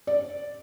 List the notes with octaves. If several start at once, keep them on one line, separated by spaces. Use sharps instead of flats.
D5